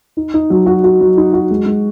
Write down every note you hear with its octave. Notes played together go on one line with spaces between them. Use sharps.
D#4
D#4
F#3
F#4
F#4
F#3
D#4
F#4
G#3
G#3